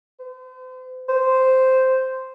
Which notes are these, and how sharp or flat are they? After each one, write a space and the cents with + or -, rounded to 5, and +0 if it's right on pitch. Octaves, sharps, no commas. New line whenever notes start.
C5 -40
C5 -5